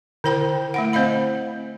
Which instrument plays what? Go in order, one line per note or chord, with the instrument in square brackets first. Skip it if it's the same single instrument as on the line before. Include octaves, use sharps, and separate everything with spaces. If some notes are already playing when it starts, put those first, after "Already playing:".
[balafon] D3 E4 C5 G5
A3 E4 F#5
C4 C5 D#5 F5 B5